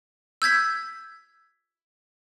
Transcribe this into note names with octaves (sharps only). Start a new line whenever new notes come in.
E6 G6 G#6 B6